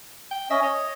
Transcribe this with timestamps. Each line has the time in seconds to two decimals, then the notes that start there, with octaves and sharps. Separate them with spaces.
0.31 G5
0.50 C#4 D#5 E5
0.63 C#5 D#5